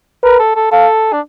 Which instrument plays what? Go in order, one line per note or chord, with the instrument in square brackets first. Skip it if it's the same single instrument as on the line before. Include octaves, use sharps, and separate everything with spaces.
[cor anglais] A#4 [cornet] B4
[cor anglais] A4
A4
[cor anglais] A4 [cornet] F5
[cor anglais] D4